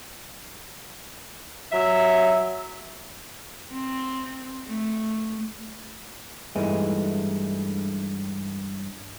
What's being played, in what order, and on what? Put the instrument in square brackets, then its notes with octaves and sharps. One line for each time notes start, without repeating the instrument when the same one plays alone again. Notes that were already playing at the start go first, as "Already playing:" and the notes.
[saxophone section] F#3 E5
[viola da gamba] C4
A3
[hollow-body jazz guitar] G2 E3 G#3 A3 D#4